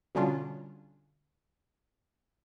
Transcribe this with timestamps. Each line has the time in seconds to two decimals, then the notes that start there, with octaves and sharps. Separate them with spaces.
0.15 B2 D3 G3 C#4 D4 F4